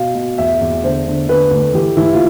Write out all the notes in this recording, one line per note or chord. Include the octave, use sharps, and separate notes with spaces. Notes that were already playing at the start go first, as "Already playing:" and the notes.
Already playing: B2 F5
B2
E2 E5
E2
D3 C5
D3
D3 B4
D2
E3 G4
E3 E4
F4